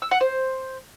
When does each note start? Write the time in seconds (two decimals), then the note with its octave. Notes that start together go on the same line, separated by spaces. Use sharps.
0.02 E6
0.11 F#5
0.21 C5